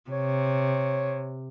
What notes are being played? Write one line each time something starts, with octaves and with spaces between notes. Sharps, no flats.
C3 C#5